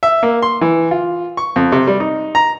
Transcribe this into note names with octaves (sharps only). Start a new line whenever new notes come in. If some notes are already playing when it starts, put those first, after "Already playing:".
E5
A#3
C6
E3
F4
C#6
F2
C3
G3
D#4
A#5